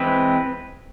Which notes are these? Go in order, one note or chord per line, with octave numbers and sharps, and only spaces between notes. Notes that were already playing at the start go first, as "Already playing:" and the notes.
Already playing: E3 G#3 C4 B4